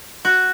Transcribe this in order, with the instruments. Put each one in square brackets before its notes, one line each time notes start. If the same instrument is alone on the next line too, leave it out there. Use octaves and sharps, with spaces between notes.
[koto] F#4